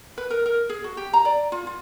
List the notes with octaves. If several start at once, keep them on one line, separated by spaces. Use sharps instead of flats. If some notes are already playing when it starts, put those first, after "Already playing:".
B4
A#4
A#4
G#4
F#4
G4
A#5
D5
F4
F4